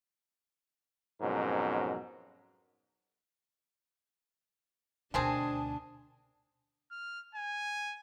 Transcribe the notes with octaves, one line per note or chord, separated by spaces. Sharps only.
F2 G#2 B2 F#3 C#4 A#4
D2 B2 D#3 C4 D4 G#4 G#5 A5
F6
G#5